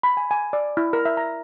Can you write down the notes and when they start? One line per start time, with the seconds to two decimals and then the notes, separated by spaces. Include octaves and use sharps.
0.03 B5
0.17 G#5
0.31 G#5
0.53 D5
0.77 E4
0.93 A#4
1.05 E5
1.17 A#5